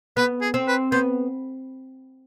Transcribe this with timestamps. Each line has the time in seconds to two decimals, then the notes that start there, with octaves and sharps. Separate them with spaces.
0.17 B3 B4
0.41 G#4
0.54 C4
0.68 B4
0.92 B3 C5